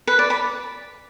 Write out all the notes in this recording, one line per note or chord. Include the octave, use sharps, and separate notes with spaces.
B4
D5
B5